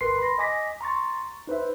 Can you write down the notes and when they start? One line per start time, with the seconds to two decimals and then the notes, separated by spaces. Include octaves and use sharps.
0.01 G1 A#4 B4 C6 C7
0.18 B5 C6 A#6
0.38 D#5 G#5 D6 A#6 B6
0.81 A#5 C6 C#6 A6
1.47 D#4 B4 C5 E5